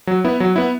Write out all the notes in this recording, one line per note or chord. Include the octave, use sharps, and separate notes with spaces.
F#3
B3 E4
F#3
B3 E4